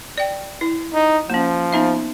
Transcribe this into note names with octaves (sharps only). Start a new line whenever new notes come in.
D5 G5
E4
D#4
F3 A#3 C#4
B3 D#4 E5